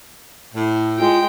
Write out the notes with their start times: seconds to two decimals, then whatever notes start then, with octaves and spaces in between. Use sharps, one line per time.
0.55 A2
0.98 G#3 F4 G5